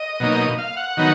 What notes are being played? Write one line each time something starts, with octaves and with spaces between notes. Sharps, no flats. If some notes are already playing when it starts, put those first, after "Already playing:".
Already playing: D#5
B2 F#3 A#3 D#4
F5
F#5
D#3 F#3 B3 D#4